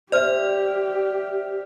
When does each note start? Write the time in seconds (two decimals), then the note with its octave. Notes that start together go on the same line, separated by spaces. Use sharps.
0.12 G4 C5 D5 E5 F6